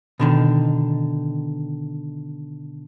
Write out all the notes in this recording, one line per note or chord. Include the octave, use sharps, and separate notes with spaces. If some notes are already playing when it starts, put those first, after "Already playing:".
B2 D3 D#3